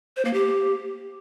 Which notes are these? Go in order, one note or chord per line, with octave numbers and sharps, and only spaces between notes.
C5
A#3
G4